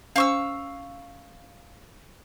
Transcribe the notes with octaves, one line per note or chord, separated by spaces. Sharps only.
C#4 C5 F5 C#6 E6